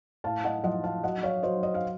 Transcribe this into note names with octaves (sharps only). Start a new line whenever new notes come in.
A2 F5 A5
D#5 F#5
F3 D#5 F#5
F5 A5
F#3 D#5 F#5
C#5 F5
F#3 C5 D#5
D#5
F5